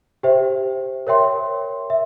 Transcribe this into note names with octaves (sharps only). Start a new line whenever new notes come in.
G4 C5 E5 G5
A#4 C#5 E5 G5 C6
E5